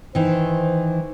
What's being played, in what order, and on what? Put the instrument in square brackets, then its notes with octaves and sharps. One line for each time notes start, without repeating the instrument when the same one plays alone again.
[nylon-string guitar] D#3 E3 [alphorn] C5